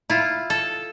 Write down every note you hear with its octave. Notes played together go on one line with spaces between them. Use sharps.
E4 F4
A4